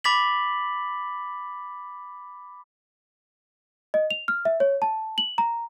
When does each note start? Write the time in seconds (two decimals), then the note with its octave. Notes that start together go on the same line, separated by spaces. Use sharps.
0.04 B5 D6 A6 B6 F#7
3.94 D#5
4.10 F7
4.28 F6
4.45 E5
4.60 C#5
4.82 A5
5.18 F#7
5.38 A#5